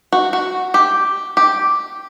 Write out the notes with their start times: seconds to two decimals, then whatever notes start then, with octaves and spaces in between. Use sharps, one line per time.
0.12 F#4
0.33 F#4
0.74 G4
1.37 G4